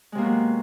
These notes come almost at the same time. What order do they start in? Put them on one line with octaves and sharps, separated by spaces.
G#3 C3 A#3 B3 F#3